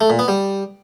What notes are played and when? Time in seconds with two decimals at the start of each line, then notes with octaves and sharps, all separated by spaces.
0.01 A3
0.10 A#2
0.19 B3
0.28 G3